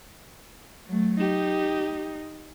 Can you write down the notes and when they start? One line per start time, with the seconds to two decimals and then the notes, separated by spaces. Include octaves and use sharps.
0.87 F#3 A3
1.20 D#4 G4